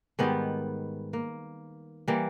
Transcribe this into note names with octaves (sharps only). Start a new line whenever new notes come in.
G#2 D#3 G3 B3
A#3
E3 G3 A#3